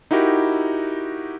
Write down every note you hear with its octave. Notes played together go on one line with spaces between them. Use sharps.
D#4 E4 F#4 G4 A#4